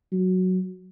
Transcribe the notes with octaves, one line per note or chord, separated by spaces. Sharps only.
F#3